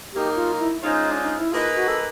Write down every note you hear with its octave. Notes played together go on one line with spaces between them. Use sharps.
F#3 A#3 D#4 G4
F4
E4
G#3 C#4 D#4 F4 G#4 C5
D4
D#4
E4
A#3 D#4 F4 G#4 B4
F#4
A4